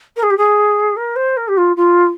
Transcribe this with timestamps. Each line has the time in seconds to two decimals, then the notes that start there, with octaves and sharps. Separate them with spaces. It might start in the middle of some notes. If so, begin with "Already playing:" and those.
0.16 A#4
0.22 G#4
0.30 G4
0.37 G#4
0.96 A#4
1.15 C5
1.36 A#4
1.48 G4
1.57 F4
1.76 F4